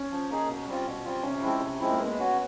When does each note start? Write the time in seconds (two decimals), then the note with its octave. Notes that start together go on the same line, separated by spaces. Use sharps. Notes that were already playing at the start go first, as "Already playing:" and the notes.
Already playing: C#4
0.11 F3
0.30 A#3 D#4 G#4
0.48 B2
0.67 G3 C4 F4
0.86 B2
1.05 G3 C4 F4
1.23 C3 C#4
1.42 F3 G#3 C4 E4
1.62 C3
1.80 F3 G#3 C4 E4
1.91 A#3
2.00 G#3 B3
2.19 C#4 F#4